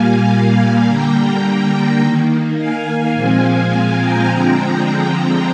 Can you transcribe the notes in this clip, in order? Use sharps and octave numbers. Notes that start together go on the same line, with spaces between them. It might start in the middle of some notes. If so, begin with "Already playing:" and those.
Already playing: A#2 G3 A#3 F5 G#5
D3 G3 A#3 G5 A#5
D#3 A#3
F5 G#5
A#2 F3 G#3 C4
F5 G#5
G5 A#5
D3 F3 G#3 C4